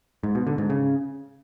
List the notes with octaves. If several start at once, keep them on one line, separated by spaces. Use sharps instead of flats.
G#2
B2
D3
G#2
C#3